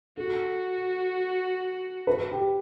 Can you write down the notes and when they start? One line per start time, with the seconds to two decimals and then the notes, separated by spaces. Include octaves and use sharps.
0.17 F#4 A4
2.07 B4
2.31 G4